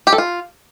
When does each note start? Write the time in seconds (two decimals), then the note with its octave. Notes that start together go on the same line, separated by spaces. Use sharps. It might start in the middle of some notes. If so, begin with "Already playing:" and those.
0.07 G4
0.13 A4
0.18 F4